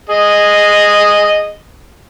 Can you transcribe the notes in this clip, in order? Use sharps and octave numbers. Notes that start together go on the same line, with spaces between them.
G#4 D#5